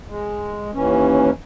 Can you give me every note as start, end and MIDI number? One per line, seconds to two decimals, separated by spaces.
0.07 0.71 56
0.73 1.30 39
0.73 1.30 52
0.73 1.30 61